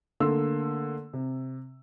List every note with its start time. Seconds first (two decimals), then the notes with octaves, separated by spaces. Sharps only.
0.20 D3 A3 A#3 C6 E6
1.13 C3